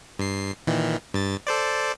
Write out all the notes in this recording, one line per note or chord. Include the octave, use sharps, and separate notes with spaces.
G2 C7
A#2 D#3 E3
G2 A6
A4 C5 D5